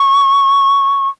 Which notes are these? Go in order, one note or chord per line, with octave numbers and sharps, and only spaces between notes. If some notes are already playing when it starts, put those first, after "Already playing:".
Already playing: C#6